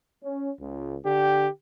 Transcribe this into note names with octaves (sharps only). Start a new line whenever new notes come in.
C#4
C#2
D3 G4